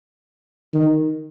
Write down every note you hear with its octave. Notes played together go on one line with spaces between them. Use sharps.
D#3